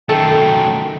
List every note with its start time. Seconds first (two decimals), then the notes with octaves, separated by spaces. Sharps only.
0.09 F#2 D#3 A3 A4 G5